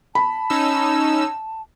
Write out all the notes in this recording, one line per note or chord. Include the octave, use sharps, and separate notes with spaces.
A5 B5
C#4 D#4 E6